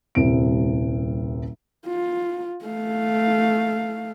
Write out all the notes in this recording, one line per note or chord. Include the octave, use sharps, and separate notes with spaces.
D#1 C2 C3 C4 D7
F4
A3 F5